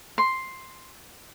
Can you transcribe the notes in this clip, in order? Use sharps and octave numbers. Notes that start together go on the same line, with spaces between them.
C6